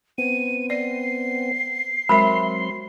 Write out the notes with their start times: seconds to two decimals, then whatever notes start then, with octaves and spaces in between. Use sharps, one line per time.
0.18 B3 C4 D#7
0.70 D5 C7
2.09 F#3 G#3 C4 A#4 E5 B5 C6